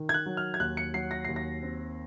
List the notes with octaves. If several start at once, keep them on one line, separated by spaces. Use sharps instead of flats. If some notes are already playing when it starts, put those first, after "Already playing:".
Already playing: D#3
G#6
F#6
F#3
F6
G#6
D#2 F#6
C#7
F#3 C7
A#6
D#2 C7
A#6
C4